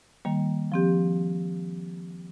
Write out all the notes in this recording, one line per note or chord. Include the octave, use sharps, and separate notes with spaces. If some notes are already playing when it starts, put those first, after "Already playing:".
D#3 G3 A#3
F3 C4 G4